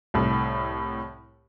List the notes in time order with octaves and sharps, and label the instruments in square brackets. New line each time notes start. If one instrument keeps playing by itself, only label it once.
[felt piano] C2 A2